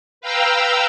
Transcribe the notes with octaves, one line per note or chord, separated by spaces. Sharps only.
B4 F5 G5 A#5 E6